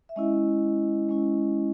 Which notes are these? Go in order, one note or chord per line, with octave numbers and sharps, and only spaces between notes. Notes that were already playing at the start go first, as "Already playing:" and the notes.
E5
G#3 C#4 E4 D#5
G#3 C#4 E4